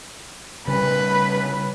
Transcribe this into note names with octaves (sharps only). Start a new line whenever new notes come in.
C#3 G3 B4